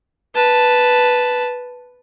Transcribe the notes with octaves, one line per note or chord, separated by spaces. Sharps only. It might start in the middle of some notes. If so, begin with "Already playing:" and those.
B4 A5